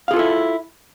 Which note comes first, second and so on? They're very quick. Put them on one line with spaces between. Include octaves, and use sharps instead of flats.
F5 G#4 F4 A4 E4